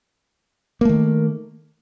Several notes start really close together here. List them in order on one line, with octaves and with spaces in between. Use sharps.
A#3 A3 D#3